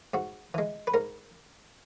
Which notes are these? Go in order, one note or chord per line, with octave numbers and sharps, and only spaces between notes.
G#2 F#4
E3 G#3
B4
G#2 A#4